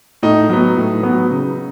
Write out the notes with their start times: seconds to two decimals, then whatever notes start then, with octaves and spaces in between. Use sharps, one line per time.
0.23 A2 D#4
0.50 F#3 B3
0.77 A2
1.03 F#3 B3
1.30 C#3